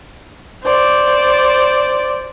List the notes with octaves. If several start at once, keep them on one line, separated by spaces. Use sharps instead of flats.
C5 D5